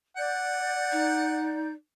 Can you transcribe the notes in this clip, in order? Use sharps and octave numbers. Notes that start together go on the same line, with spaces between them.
D5 F#5 G6
D#4